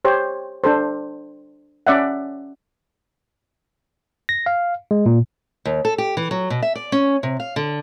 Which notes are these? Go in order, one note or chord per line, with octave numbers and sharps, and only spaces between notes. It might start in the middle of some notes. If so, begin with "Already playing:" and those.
G4 C5 C#5
D4 A4 C5
C#4 D5 E5 F#5
A#6
F5
G#3
A#2
D#2
A4
G4
E3
F#3
B2
E5
D5
C#4
C3
F5
D3